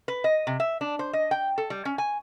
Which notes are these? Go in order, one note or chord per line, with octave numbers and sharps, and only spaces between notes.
B4
D#5
C3
E5
D4
C5
D#5
G5
A4
G3
C#4
G#5